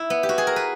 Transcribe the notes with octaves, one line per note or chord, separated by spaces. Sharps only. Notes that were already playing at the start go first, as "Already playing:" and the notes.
Already playing: E4
B3
G4
F#4
G#4
A#4
B4